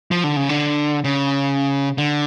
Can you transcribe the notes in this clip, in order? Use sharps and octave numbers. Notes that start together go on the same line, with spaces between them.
F3
D3
C#3
D3
C#3
D3